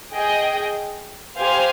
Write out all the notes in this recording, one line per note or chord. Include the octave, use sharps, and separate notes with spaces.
G#4 D#5 G5
G4 C5 F5 G#5